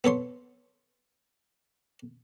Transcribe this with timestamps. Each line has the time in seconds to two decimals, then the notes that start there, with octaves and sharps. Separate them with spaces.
0.04 B3 A4 C#5 C6